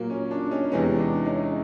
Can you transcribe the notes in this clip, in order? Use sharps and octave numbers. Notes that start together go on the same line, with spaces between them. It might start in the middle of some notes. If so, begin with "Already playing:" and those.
Already playing: A#2 F#3 A#3
C#4
D4
C#4 D#4
E2 C3 E3 G#3 B3 C#4
D4
C#4 D#4